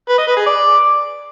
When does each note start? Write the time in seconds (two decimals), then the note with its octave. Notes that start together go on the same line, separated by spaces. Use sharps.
0.08 B4
0.18 D#5
0.27 B4
0.37 G#4
0.46 D5